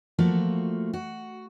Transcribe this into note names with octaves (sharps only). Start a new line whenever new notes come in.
F3 A3 A#3 F4 F#4
F#4